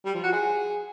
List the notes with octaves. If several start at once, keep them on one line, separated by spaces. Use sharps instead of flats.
G3
F3
F#4
G#4